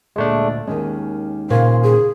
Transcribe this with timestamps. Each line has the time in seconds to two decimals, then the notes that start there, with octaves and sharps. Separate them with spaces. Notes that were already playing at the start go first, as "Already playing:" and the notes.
0.16 D2 A#2 G#3 A3 D4
0.67 D#2 D#3 G#3 C#4
1.50 A#2 C#3 C5 F5
1.83 G#4